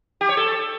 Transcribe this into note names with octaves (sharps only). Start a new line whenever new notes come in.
G4
C#5
A4